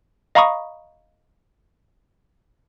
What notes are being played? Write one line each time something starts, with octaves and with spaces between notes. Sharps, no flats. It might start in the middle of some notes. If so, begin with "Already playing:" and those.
D#5 F5 A#5 B5 C#6 D#6